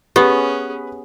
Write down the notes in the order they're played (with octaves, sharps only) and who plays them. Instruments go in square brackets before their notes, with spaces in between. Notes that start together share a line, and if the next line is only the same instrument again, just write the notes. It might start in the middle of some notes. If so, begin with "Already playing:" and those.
[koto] B3 [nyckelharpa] C#4 G#4 [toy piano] G4 [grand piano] B4